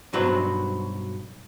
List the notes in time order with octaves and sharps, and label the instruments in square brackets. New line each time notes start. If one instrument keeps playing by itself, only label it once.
[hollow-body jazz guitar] B1 G2 F#3 F#4 B4 C5